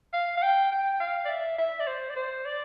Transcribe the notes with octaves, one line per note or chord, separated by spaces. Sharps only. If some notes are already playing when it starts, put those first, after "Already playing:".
F5
F5
G5
G5
F5
D5
E5
E5
D5
C5
D5
C5
D5